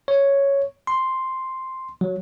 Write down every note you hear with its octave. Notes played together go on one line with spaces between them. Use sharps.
C#5
C6
F#3